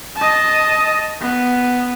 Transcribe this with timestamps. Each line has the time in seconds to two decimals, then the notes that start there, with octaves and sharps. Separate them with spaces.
0.16 D#5 A5
1.21 B3